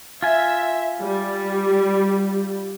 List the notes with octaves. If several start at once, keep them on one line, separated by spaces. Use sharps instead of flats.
F4 E5 G#5
G3